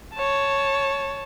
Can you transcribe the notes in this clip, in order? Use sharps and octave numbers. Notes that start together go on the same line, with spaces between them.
C#5 A5